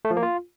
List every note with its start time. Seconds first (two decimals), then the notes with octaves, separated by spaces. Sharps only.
0.05 A3
0.11 F3
0.17 A#3
0.23 F4